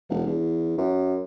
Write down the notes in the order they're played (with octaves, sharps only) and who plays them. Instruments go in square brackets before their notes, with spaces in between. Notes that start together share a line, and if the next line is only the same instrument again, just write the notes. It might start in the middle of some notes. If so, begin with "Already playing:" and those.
[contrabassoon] E1
E2
F#2